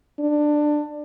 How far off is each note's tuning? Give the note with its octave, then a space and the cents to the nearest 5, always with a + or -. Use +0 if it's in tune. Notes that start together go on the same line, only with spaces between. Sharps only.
D4 +15